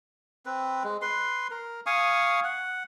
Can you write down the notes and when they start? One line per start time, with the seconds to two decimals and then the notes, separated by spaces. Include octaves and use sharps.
0.46 C4 B4
0.84 G#3
1.02 B4 C6
1.51 A#4
1.86 F5 G#5 C#6 D#6
2.44 F#5